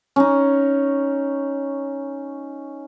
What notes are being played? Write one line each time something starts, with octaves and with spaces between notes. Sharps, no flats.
C#4 D#4